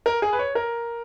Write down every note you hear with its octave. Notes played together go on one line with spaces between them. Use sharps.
A#4
G#4
B4
C#5
A#4